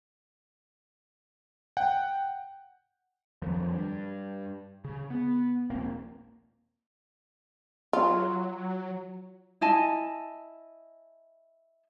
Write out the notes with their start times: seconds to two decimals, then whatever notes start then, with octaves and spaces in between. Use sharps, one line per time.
1.77 F#5 G5
3.42 F2 D#3 F3 F#3
3.72 G2
4.85 C#3
5.10 B3
5.70 D#1 A#1 A#3 C4
7.93 F#3 F4
9.61 E4 D#5 G#5 A5